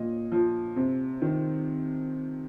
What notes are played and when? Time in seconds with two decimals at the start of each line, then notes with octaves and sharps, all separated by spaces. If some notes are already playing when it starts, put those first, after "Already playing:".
Already playing: A#2 D#5
0.32 F3
0.76 C3
1.22 D#3